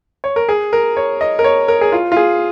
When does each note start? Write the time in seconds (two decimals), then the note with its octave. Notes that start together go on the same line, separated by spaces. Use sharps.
0.24 C#5
0.36 A#4
0.49 G#4
0.73 A#4
0.97 C#5
1.21 D#5
1.39 A#4
1.44 C#5
1.68 A#4
1.81 G#4
1.92 F4
2.12 F4
2.17 G#4